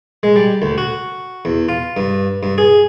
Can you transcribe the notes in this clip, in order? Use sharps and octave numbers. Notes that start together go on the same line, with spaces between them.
G#3
G3
D2
F#4
E2
F4
G2
G2
G#4